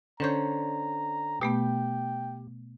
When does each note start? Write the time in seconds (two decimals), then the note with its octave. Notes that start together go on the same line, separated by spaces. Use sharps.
0.20 D3 C#4 C5 C#5 A#5 G6
1.41 B2 A3 B3 G4 G5